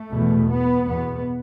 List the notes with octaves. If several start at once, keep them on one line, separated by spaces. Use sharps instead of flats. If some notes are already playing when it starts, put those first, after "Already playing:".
Already playing: A3
E2 B2
B3
E2 B2 B3